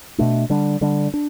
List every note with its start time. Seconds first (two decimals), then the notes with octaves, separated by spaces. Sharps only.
0.18 B2 A3 D4
0.50 D3 G3 D4
0.81 D3 G3 D4
1.14 D4